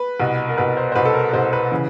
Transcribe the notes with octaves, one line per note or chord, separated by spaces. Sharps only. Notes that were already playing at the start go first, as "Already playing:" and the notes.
Already playing: B4
C2 B2
A#4
C2 B2 B4
C5
C5
C2 B2 B4
A4
A#4
C2 B2 C5
B4
C#3 E3